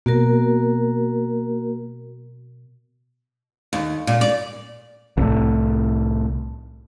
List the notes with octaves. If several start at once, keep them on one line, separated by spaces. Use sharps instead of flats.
B2 A#3 F#4 A#4
D#2
A#2
D5
C2 A2